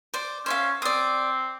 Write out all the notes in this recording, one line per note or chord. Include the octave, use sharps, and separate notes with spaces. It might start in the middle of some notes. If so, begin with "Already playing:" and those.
C5 D5
C#4 C5 E5 F5
C4 D5 D#6